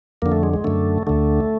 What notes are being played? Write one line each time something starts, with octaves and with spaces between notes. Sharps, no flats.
F2 D3 A#3
A3
G#3
G#3
F#2 D3 A3
D2 D3 A3